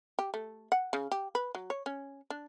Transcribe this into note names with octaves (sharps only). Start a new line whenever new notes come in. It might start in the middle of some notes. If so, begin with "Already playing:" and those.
G4
A3
F#5
C#3
G4
B4
F#3
C#5
C#4
D4